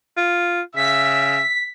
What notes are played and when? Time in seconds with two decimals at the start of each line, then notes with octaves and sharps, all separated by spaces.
0.17 F4
0.76 C#3 E5 B6